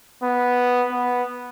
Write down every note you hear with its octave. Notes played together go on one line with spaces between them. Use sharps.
B3
B3